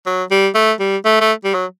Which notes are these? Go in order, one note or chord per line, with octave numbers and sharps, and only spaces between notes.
F#3
G3
A3
G3
A3
A3
G3
F#3